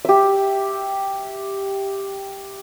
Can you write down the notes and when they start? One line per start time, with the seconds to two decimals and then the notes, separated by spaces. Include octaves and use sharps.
0.05 G4 E5